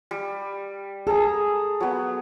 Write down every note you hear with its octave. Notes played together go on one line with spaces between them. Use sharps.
G3
G#4 A4 A#5
F#3 B3